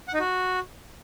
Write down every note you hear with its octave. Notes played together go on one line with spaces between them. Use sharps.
F#5
D#4
F#4